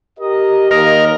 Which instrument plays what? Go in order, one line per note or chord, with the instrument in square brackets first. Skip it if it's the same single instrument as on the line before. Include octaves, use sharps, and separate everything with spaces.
[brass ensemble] G4 A#4 D#5
[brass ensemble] D#2 D#5 [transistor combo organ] A#4